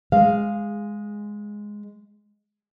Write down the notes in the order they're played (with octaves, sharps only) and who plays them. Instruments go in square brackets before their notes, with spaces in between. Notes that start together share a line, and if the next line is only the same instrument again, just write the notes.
[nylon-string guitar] G#3 F5